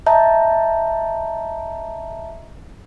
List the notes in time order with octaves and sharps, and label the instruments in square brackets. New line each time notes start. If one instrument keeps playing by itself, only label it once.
[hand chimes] D#5 E5 A5 A#5 G6